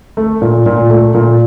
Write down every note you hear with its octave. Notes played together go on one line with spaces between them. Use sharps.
A3
A#2
A#2
A3
A#2